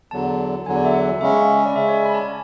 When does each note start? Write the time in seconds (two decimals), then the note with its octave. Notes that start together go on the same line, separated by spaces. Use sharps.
0.11 E2 D3 F#3 A5
0.66 E2 D3 F#3 G#5
0.76 D5
0.85 E5
0.94 F#5
1.21 C#3 G#3 C#4 E5
1.66 D5
1.76 C#3 G#3 C#4 E5
1.89 C#5
1.94 D5
2.05 B5
2.14 A5
2.21 G#5